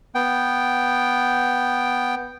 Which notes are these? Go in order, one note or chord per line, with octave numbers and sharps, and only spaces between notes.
B3 G5